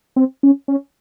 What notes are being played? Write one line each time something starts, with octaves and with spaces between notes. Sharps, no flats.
C4
C#4
C#4